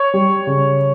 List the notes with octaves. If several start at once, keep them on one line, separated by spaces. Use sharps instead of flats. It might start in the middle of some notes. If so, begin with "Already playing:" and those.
Already playing: C#5
G3
C#3